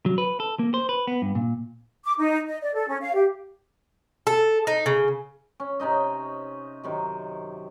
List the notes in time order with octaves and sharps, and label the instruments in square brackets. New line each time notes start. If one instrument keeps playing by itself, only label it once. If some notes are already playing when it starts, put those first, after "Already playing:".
[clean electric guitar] F#3
B4
A4
A#3
C5
B4
B3
G2
A#2
[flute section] D6
D#4
D#5
D5
A4
C#4
F5
G4
[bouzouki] A4
D#4
C#3
[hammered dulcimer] C#4
C3 C#4 D#4 D#5
F#2 C3 D#3